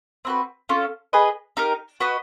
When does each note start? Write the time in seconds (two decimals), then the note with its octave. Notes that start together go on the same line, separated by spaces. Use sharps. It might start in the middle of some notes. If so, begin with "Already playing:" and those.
0.25 C4 D#4 F#4 B4
0.69 C#4 F4 A4
1.13 G#4 B4 D#5
1.57 D#4 G4 A#4
2.00 F#4 B4 D#5